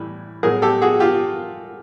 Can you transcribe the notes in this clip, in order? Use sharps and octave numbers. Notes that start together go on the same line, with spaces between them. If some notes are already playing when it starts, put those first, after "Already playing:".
Already playing: A2 E3 G3
A2 F#3 G#4 A#4
G4 A4
F#4 G#4
F4 G4